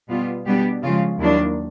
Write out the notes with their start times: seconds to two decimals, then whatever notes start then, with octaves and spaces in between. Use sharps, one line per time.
0.09 B2 G3 B3 F4
0.45 B2 G3 B3 D4 G4
0.83 C#3 F3 G#3 F4
1.19 D#2 D#3 F#3 A#3 D4 E4